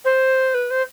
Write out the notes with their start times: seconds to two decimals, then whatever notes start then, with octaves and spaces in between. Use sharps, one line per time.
0.05 C5
0.54 B4
0.70 C5